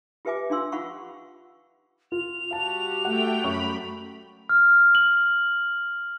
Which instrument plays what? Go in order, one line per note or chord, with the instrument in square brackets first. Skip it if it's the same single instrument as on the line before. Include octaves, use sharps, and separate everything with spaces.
[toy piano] F4 G4 B4 E5 G#5 D6
D4 F4 F5 C6 E6
F4 F5 F#5 B5 C#6
[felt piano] F4 [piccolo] F7
[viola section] G3 F#4 G4 [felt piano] F5 A5
[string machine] A3 G5 [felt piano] F#5
[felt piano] F#2 C#6 [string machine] B5
[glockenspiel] F6
F#7